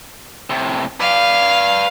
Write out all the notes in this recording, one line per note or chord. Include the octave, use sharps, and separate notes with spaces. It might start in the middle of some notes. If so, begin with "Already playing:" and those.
A2 C3
B4 D5 F5